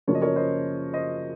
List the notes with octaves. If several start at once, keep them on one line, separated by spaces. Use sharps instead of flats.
F#2 C#3 F3 A#3 C#4 C#5
D#5
A#4 C#5
C5 D#5
C5 D#5